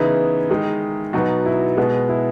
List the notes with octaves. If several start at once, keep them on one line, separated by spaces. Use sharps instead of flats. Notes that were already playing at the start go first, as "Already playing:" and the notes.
Already playing: C#3 E3 B3 D#4 E4
D#3 G#3 D#4
B2 F#3 B3 D#4 F#4
E4
B2 G#3 B3
E4